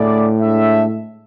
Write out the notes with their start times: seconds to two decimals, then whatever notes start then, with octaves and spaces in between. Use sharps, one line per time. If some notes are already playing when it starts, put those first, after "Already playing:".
Already playing: A2 D3 A3 E4 G#4 D5
0.40 G#3 D4 A4 E5